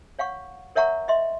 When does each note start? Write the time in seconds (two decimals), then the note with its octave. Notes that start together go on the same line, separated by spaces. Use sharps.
0.19 C#5 F5 F#5 C#6
0.75 A#4 C#5 E5 F#5 A#5 C#6
1.08 D#5 E5 C6